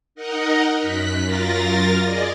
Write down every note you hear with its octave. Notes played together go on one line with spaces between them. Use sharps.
D#4 A#4 D#5 F#5
F#2 F#6 B6
F#2 F4 A#4 A6 A#6
G#4 D5 D#5